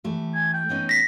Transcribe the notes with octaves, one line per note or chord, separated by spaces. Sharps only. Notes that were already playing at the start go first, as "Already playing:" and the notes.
E3 A3 G4
G#5
G5
B3 C#4 D#4
A#6 B6